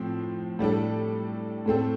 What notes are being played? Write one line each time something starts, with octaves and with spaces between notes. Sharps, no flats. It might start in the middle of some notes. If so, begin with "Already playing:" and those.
Already playing: A2 F3 C4
A2 G3 D4 A4
A2 A3 C4 A4